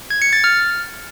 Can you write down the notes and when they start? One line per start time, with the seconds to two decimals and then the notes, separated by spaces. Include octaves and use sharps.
0.10 G#6
0.22 C#7
0.33 A6
0.44 F6